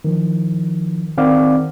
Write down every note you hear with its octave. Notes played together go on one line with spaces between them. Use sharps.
D#3 F3
D#3 C4 D5 F5 F#5 D6